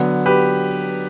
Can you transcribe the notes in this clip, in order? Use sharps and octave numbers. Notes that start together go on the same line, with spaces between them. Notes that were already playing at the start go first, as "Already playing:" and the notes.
Already playing: D3 F#3 B3
G4 B4